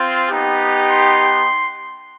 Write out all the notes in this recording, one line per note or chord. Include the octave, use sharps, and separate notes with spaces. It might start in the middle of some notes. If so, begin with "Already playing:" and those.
Already playing: C4 F4
B3 D#4 G4
C6